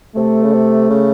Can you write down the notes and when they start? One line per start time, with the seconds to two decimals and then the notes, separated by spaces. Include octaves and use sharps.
0.16 C3 A3
0.43 C#3
0.53 C3
0.90 C#3